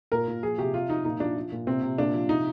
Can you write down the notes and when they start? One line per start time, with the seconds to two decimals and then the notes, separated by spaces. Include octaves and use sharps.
0.12 A#2 A#4
0.28 A#2
0.43 F3 G#4
0.58 C3 G4
0.74 C3 F4
0.89 F3 D#4
1.05 A#2 D#4
1.20 F3 D4
1.36 F3
1.52 A#2
1.67 C3 C4
1.83 C3
1.98 A#2 D4
2.14 F3
2.29 C3 D#4